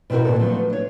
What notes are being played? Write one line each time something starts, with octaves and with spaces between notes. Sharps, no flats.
B2 C4 E4 F#4 A#4
A#2 D3 C4 A4
F3 F#3 A3 B3
D4 C#5